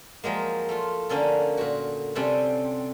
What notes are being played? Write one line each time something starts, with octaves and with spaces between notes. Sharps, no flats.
F3 F#3 G#3 A#3
A3 F4
D3 A#3 C#4 A4
A#2 F#4
C3 G3 C4 C#4 A4 F#5